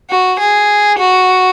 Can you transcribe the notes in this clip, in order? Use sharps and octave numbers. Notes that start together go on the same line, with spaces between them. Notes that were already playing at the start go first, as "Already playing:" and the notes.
F#4
G#4
F#4